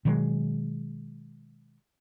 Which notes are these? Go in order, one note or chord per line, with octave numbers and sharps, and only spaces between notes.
B2 D#3 F#3 G#3